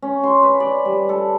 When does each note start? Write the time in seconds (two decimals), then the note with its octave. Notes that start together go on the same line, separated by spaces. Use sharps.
0.02 C#4
0.23 C6
0.43 B4
0.60 D5
0.85 G3
1.09 A4